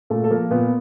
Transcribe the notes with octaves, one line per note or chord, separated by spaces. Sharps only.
A#2 A3 A4
A4
F3 A#3 A#4
A#2 B3 B4